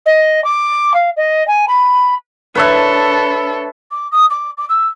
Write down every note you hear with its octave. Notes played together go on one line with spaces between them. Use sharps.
D#5
D6
F5
D#5
G#5
B5
D4 A4 B4 C#5 E5
D6
D#6
D6
D6
E6